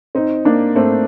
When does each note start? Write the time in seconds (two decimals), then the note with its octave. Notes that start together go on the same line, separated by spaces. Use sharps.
0.15 C4 D#4
0.45 A#3 D4
0.75 A3 C4